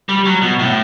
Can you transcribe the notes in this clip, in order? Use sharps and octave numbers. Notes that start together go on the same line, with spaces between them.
G3
F#3
B2
A2